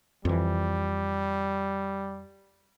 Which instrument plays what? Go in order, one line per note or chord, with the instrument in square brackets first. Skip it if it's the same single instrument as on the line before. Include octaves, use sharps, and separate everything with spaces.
[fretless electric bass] F2 E3 [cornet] G3